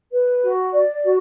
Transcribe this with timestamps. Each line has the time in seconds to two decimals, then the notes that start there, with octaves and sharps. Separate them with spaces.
0.12 B4
0.43 F#4
0.73 D5
1.04 F#4